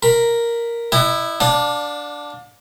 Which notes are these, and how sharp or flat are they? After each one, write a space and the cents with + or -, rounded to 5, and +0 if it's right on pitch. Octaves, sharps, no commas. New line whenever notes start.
A#4 +0 B5 +0
E4 +0 D#5 -35 F#5 +35
D4 +0 D5 +20 F5 +45